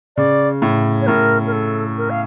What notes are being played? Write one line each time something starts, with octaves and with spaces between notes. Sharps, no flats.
C#3 D5
A2
C#5
A2 A#4
A#4
A4
A#4
F5